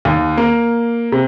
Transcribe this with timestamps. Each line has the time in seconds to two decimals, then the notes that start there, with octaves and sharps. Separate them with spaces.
0.05 D#2
0.37 A#3
1.12 C3